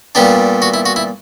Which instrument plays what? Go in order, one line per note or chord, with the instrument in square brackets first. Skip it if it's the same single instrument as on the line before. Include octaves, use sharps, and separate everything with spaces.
[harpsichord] A#2 G3 B3 D4 G4
F#4
E4
F#4
E4